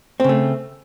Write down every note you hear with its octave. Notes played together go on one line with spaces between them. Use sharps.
C#3 A3 C4